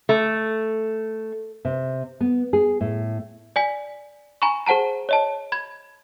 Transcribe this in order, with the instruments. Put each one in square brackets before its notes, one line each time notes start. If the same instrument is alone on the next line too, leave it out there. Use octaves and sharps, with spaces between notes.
[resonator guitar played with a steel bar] A3
[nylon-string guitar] C3
B3
G#4
A2
[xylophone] D5 G#5 B6
G#5 A#5 B5 C#6
G#4 C5 F#5 A5 A#5
C#5 D#5 A5
B5 G#6